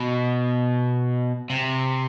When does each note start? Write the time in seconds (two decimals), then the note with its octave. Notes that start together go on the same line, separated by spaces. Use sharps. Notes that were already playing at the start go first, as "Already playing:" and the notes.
Already playing: B2
1.50 C3